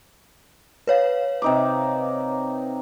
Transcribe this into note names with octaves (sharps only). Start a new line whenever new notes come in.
B4 C#5 F5
C3 D#4 D6